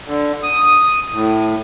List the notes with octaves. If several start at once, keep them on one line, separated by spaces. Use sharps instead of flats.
D3
D#6
A2